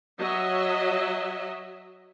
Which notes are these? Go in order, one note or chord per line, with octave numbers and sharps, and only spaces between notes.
F#3 D#5 E5